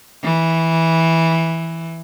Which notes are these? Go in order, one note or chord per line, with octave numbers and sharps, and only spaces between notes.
E3